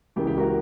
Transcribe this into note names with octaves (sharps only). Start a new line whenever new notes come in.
C#2 C#3 E3 A#3 G4
G4
F#4 A#4